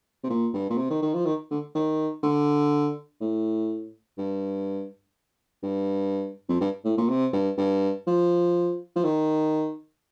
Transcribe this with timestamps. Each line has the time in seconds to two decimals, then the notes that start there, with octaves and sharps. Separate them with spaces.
0.24 C3
0.30 A#2
0.54 G2
0.70 A#2
0.78 C3
0.90 D#3
1.02 D#3
1.14 F3
1.26 D#3
1.51 D3
1.75 D#3
2.23 D3
3.21 A2
4.18 G2
5.63 G2
6.49 F2
6.61 G2
6.85 A2
6.98 A#2
7.10 C3
7.33 G2
7.58 G2
8.07 F3
8.96 F3
9.04 D#3